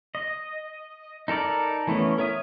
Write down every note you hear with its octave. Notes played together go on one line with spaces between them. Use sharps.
D#5
D#4 A4 A#4 D5
E3 A3 B3 C#4
A#4 C#5 E5 D#6